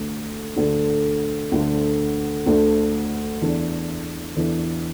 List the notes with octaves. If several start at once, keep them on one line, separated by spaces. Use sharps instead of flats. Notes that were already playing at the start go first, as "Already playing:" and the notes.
Already playing: D2 D3 A3
D2 D3 A3
D2 D3 A3
D2 D3 A3
E2 E3 D4 A4
E2 E3 D4 A4